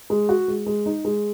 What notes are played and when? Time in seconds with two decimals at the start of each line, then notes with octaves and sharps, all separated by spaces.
0.10 G#3
0.29 F#4
0.48 G#3
0.66 G#3
0.86 D#4
1.05 G#3